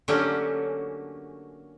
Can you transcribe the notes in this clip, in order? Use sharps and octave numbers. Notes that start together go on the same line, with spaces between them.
D3 F#3 A3 A#3 C#4 G4